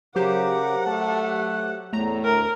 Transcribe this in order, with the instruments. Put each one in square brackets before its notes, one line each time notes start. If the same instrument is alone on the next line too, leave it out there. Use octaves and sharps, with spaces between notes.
[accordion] C#3 D6 [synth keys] F#3 G4 C5 [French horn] A#4 [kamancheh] F#5
[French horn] A3 [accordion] A5
[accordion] F#6
[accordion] E2 [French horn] A2 [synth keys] A3 A#5
[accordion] D2 [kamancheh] A#4